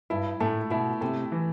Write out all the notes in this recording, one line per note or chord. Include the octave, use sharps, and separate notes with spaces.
G2 E4
A2 A3
B2 E4
C3 A3
E3